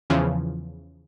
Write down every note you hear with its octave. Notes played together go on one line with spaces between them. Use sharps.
E2 C#3 E3 F3